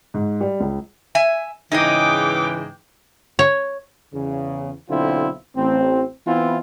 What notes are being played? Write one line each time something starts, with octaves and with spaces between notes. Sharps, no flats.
G#2
G3
C#2
E5 G#5
G#2 C#3 E3 D#4 G#4 D#5 G5 D6
C#5
E2 C#3
B1 D3 C4 E4 F4
A1 C4
E3 B3 C4 E4 F4